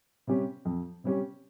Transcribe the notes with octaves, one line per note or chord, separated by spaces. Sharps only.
C3 G3 C#4 G4
F2
C3 G3 C#4 G4